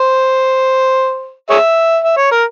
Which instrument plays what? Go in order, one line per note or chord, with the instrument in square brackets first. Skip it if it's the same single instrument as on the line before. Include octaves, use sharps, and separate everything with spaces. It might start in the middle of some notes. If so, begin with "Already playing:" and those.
Already playing: [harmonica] C5
G#4 C#5 E5
E5
C#5
A#4